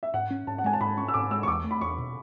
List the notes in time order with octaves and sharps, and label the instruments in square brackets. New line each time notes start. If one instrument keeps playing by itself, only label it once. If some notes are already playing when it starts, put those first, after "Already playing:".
[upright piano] E5
[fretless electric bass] G#2 [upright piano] F#5
[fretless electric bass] C#4
[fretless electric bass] G#2 [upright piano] A5
[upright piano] F#5
[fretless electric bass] G#3 [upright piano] G#5
[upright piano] A5
[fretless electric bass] G#2 [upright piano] B5
[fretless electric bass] C#4 [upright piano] C#6
[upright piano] E6
[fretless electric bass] G#2 [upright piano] D6
[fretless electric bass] G#3 [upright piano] E6
[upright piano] C#6
[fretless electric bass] E2 [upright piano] D6
[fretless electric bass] A3
[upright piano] B5
[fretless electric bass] E2 [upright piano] C#6
[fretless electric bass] B2